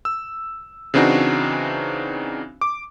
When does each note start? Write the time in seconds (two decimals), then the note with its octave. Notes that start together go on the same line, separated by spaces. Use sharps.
0.05 E6
0.94 C#3 E3 C4 D4 D#4 F#4
2.61 D6